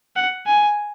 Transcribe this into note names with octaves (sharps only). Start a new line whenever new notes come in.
F#5
G#5